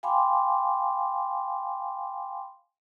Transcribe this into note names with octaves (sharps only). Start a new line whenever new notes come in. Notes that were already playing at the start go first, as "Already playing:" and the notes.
F5 G5 G#5 B5 C6 D6